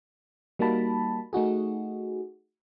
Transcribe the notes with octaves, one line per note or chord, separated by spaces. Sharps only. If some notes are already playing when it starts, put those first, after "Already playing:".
G3 A#3 D#4 F#4 A5 B5
A3 D#4 F#4 G#4